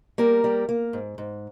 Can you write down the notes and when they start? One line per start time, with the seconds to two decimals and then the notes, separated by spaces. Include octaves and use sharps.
0.18 G3 A#3 A#4
0.44 G3
0.69 A#3
0.93 G#2
1.18 G#2